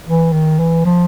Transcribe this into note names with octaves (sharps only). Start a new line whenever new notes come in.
E3
D#3
E3
F3